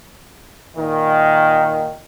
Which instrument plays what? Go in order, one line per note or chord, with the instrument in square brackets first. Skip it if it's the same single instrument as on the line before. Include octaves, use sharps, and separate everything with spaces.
[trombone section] A#2 D#3